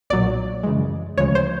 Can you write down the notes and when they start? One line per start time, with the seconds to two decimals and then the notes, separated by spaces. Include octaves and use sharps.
0.10 B1 A#2 F#3 D5
0.63 F#2 C#3 E3 G#3
1.17 D2 C#3 F3 G#3 C#5
1.35 C5